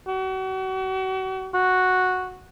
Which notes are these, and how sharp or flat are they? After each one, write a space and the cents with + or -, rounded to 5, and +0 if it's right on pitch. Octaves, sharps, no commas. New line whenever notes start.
F#4 +35
F#4 -5